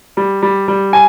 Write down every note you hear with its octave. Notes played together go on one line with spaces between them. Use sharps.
G3
G3
G3
G#5